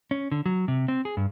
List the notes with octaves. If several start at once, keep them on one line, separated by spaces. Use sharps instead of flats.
C#4
D3
F#3
C3
C4
G#4
G2